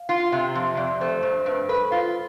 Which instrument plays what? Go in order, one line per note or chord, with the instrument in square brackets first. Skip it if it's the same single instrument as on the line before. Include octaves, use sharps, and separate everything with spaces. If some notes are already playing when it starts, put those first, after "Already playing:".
Already playing: [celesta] F5
[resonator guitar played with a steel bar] F4
[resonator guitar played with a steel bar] C3 [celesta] E5
[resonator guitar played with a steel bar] F2 [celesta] E5
[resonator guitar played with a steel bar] F2 [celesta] D5
[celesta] D5
[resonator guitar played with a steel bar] A3 [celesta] C5
[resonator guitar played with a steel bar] G2 [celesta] C5
[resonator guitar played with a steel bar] G2 [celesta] B4
[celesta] A4 [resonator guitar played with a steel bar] B4
[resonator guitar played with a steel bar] F4 [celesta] F5